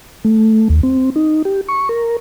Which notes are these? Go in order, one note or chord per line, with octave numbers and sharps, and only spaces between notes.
A3
D#2
C4
D#4
G4
C#6
A#4